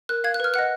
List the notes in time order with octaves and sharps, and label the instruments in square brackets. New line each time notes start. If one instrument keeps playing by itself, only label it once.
[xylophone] A#4 F#6
F5 G#6
F#6
B4 F6
D#5 F#5 F#6